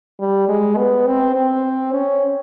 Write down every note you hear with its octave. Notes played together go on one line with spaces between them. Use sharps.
G3
G#3
B3
C4
C4
C#4